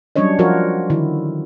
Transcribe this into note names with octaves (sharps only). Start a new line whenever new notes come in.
F#3 G3 C#4 D4 C#5 D#5
F3 F4 F#4 A#4 C#5
D3 D#3 E4